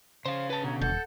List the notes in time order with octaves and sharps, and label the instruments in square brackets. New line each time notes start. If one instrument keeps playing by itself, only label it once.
[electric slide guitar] C#3 C#4 [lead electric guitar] C5 F5
[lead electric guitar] B4 A5
[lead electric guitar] B2 D3 [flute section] C#5 A#5
[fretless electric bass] D#1 [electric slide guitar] A4 [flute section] F#5 G6